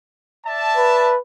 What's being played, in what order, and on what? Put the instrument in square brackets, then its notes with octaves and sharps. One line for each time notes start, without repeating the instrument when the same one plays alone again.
[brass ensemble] D5 E5 A5
[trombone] B4